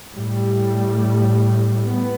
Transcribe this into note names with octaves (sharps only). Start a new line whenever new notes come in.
A2 G3
B3